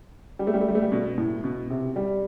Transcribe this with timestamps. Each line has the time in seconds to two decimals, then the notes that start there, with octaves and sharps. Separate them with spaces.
0.39 G3
0.47 A3
0.54 G3
0.61 A3
0.69 G3
0.75 A3
0.82 G3
0.92 B2
1.18 A2
1.44 B2
1.70 C3
1.96 G3